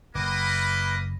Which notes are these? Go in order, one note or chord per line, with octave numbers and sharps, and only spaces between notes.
F#1 A#3 B4 D#5 B5 D6